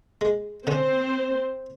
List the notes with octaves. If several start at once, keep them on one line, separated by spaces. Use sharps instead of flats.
G#3
D3 C4 C#4 C5